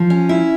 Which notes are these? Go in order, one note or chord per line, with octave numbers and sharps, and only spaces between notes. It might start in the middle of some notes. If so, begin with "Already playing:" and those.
Already playing: F3
C#4
E4